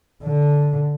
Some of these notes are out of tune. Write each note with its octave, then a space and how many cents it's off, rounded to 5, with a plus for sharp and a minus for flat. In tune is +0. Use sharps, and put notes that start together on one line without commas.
D3 -10